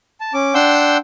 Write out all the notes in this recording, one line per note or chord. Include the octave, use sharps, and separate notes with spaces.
A5
C#4 D6
D4 F#5 G5 C6 E6 G6